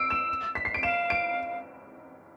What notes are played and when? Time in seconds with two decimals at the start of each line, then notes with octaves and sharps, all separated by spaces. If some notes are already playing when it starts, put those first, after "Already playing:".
Already playing: E6 C7 D7
0.10 E7
0.55 B6
0.65 C7
0.74 D7
0.83 F5 E7
1.10 D7